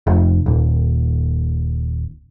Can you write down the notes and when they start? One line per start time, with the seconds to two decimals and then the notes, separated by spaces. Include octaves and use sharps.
0.07 F1
0.46 D#1